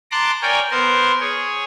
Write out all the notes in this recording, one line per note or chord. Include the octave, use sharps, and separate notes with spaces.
A5 A#5 C6 D6 F#6
A#4 C#5 D5 G5 G#5
B3 A#4 C5 C6
G#4 C#5